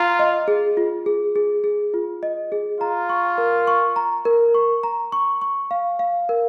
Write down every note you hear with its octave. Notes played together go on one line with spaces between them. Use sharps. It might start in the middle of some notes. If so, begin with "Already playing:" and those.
Already playing: F4 A#5
D#5
G#4
F4
G#4
G#4
G#4
F4
D#5
G#4
F4 A#5
C#6
A#4
C#6
A#5
A#4
C#6
A#5
C#6
C#6
F5
F5
A#4